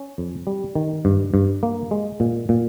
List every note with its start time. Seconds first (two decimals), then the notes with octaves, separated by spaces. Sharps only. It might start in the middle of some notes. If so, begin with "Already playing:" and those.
Already playing: C#4
0.18 F2
0.47 G3
0.75 D#3
1.05 G2
1.34 G2
1.63 A#3
1.91 G#3
2.20 A#2
2.49 A#2